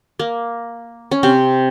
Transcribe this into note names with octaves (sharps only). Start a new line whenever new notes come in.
A#3
C#4
C3 C4